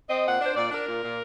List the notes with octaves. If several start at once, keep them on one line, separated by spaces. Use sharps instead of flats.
C4 D#5
A#2 F#5
D4
C5
A#2 D5
D4 A#4
A#2
A#2